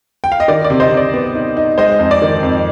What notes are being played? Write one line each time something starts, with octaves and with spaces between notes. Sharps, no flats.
G5
F5
D#5
D#3 D5
D5
C3
C5 D#5
C3
D5
B3
D#4
D#4
G#3 C5 D#5
F2
D5
D#3
F2